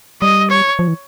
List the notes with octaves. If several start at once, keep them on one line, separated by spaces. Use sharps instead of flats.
G3 D#5
C#5
F3
E3